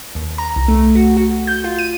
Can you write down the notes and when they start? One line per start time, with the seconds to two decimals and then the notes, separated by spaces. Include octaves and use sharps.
0.15 D#2
0.38 A#5
0.56 C2
0.68 A3
0.95 F#4
1.17 F#4
1.47 G6
1.64 F4
1.78 D#7